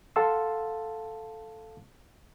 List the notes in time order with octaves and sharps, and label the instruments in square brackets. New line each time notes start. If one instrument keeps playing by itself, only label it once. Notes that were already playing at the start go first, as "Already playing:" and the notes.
[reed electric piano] A4 F5 F#5 A5 C6 E6